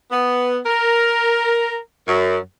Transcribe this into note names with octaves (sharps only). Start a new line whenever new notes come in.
B3
A#4
F#2